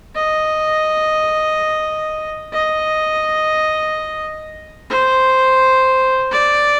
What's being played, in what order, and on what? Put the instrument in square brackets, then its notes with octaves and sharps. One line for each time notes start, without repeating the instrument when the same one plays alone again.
[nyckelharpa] D#5
D#5
C5
D5